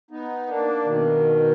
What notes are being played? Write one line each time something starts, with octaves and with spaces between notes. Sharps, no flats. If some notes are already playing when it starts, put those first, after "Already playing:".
B3 D#4
A#3 D4
B2 D#3